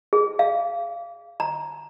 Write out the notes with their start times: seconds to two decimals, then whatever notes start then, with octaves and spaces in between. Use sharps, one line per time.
0.13 G#4
0.39 F5
1.40 A#5